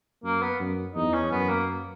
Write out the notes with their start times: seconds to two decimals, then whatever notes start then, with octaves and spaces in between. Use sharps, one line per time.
0.24 F#2 A#3
0.42 B3
0.60 F#2
0.95 E2 D#4
1.14 C#4
1.31 F#2 B3
1.49 A#3